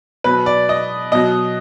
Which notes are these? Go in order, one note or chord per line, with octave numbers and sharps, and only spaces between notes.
B2 F#3 B4
D5
D#5
B2 F#3 D#5